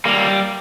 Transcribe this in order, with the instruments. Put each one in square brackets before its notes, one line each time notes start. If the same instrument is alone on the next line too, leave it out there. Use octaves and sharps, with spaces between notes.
[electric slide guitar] G3 A#3